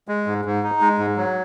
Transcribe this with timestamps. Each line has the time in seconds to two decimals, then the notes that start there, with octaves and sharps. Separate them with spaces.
0.08 G#3
0.26 G#2
0.45 G#2
0.63 D#4
0.81 G#3
0.99 G#2
1.17 F#3